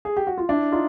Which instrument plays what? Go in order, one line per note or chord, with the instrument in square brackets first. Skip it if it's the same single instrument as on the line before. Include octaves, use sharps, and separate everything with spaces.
[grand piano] G#4
G4
F#4
F4
D4 E4
D#4 F4